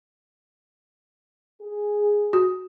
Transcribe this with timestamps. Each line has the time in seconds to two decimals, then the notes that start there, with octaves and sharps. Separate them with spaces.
1.61 G#4
2.33 F#4